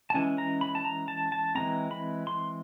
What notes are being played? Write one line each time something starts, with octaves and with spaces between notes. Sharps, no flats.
A5
E3 G#3 C#4 G#5
A#5
B5
A5
A#5
A5
A5
E3 G#3 C4 A#5
B5
C6